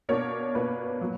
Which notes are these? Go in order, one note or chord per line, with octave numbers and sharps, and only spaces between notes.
B2 A#3 D4 A#4 C#5
B2 A#3 D4 B4
A#2 F#3